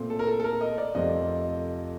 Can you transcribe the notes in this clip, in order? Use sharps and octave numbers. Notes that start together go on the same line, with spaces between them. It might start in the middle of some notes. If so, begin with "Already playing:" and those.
Already playing: A#2 A3 C4
A4
A#4
A4
A4
A#4
D#5
D5
F2 C3 F3 A3 D#5